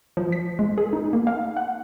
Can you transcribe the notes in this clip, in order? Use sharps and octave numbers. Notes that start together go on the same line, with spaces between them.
F3
B6
G#3
G#4
D#4
A#3
F5
F#5